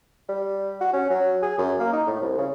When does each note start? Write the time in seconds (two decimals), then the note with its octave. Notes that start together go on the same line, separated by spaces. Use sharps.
0.29 G3
0.80 F#4
0.93 C#4
1.10 F#3
1.42 G#4
1.58 F#2
1.79 A#3
1.93 D#4
2.06 A2
2.21 C2
2.38 C#3